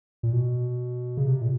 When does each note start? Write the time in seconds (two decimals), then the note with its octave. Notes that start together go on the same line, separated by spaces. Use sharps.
0.23 A#2
0.33 B2
1.17 C#3
1.26 C3
1.41 A#2